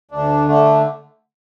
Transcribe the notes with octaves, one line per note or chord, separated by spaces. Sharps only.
D2 D4
D3 A3 D4